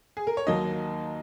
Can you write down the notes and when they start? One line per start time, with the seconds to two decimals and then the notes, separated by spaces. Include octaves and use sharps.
0.17 G#4
0.27 A#4
0.37 C#5
0.47 D#2 D#3 F#3 A#3 D#4 D#5